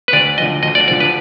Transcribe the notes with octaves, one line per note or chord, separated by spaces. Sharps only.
B4
D2 D5
D3 F3 D#5
D2 D#5
D5
D3 F3 D5
B4